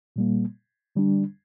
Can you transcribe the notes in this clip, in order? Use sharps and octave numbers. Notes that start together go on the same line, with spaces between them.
A#2 G3 A#3
D3 G3 D4